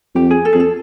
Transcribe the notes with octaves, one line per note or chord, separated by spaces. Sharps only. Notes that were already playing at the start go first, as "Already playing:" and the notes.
F2 G4
G#4
A4
F2 G#4
A4